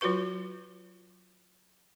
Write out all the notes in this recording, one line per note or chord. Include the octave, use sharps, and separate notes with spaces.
F#3 F4 F#4 B4 C#6